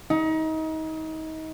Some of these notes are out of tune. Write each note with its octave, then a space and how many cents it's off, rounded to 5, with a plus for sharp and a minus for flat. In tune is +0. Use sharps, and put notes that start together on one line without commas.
D#4 +30